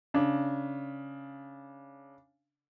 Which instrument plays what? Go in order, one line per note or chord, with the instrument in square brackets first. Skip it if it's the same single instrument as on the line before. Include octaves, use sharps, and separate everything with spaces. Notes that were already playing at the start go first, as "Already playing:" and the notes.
[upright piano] C#3 D4